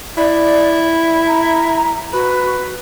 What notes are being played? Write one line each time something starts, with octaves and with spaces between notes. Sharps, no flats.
E4 D5
A#5
F#4 B4